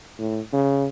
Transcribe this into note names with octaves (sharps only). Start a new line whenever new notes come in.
A2
C#3